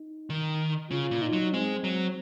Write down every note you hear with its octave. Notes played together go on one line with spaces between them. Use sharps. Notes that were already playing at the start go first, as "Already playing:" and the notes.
Already playing: D#4
D#3
C#3 F4
A#2
D#4
F#3
G#3 C4
F#3